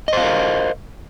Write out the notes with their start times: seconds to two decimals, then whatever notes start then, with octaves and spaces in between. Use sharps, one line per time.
0.08 D#5
0.13 C5
0.17 F5
0.22 A#4